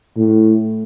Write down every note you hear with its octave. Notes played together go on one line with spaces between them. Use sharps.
A2